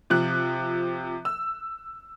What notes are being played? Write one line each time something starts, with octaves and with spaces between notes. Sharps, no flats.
C3 F3 F#6
E6